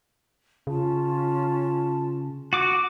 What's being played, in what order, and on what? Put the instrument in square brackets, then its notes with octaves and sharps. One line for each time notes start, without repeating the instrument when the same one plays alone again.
[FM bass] C#3 [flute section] C#4 F4 A5
[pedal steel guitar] F#4 D6 [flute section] D#6 F#6